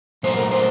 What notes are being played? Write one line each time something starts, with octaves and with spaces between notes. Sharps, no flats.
A#2 F#3 A3 C5
A#4
C5